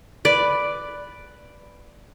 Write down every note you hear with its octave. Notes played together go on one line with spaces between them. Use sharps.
B4 D5